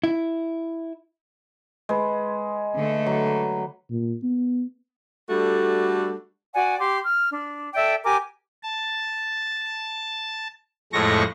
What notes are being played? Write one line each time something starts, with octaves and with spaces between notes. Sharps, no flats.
E4
G#3 B4
D3 A3
F#3
A#2
B3
G3 A3 D4 F#4 A4
F#4 D5 F#5 G#5
G4 C6 D6
F6
D4
A4 D5 E5 G5
G4 A#4 G#5 D6
A5
F2 A2 G#3 A3 C#6 A#6